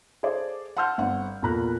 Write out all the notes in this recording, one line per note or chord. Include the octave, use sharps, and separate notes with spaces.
G#4 A4 C5 D5
F#5 A5 C6 E6 F6 G6
G1 C4 F#5
E2 A#2 A4 A#5 B5 F#6